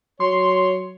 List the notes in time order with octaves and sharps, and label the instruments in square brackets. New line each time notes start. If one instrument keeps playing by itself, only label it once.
[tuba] F#3 [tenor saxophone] C#5 [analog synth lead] C6